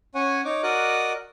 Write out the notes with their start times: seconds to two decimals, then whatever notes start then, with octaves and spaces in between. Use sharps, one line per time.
0.15 C#4 C#5 F#5 G#5
0.45 D#4 C#5 D6
0.63 F#4 A#4 D5 D#5 F#6